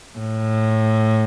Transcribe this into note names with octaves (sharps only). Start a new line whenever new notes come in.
A2